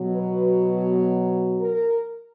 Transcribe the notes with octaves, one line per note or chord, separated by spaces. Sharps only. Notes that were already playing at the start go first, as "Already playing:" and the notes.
Already playing: B2 F#3
B4
A#4